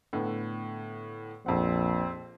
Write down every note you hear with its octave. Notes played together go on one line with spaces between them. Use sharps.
A2 D3 B3
A#1 F2 C4 F#5